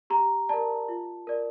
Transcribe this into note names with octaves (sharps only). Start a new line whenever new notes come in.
G4 A#5
A#4 D5 A5
F4
A#4 D5